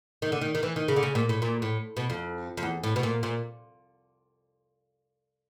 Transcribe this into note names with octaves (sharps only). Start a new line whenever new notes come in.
D#3
D3
D#3
D#3
E3
D#3
C#3
D3
C#3
A#2
A2
A#2
A2
B2
F2
F2
E2
A2
B2
A#2
A#2